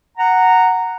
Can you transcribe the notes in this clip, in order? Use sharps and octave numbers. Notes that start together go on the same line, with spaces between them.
F#5 A#5